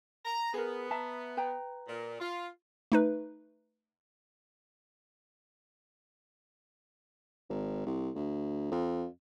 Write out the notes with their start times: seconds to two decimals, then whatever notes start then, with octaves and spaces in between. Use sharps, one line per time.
0.26 A#5
0.54 B3 G#4 A#4
0.91 E5 A5 A#5
1.37 B4 G5 A#5
1.88 A#2
2.20 F4
2.92 A3 D#4 B4
7.50 G#1
7.86 C2
8.15 D2
8.71 F2